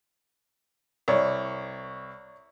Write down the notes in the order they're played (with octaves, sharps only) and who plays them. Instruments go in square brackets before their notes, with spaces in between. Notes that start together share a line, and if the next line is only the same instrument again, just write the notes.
[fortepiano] C2 [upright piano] C#5 D5